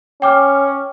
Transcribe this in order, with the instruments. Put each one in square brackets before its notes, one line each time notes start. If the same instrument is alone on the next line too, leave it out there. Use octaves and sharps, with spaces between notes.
[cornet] C#4 [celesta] G5 D6 F6